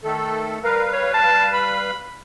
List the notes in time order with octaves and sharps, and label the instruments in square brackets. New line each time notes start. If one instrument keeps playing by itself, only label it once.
[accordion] D#3 A3 A4
[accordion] G3 B4 F5 [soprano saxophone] A#4
[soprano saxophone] C#5
A5
B5